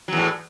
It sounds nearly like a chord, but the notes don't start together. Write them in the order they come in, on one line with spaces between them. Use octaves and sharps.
F#3 E2 A2